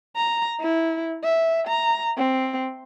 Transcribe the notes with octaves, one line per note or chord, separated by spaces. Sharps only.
A#5
E4
E5
A#5
C4